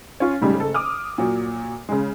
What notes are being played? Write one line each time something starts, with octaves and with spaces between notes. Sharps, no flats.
C#4 F4
A2 C#3 G3 G#3 D#4
F#1 A4
D6 D#6 F6
A#2 F#3
C#3 G#3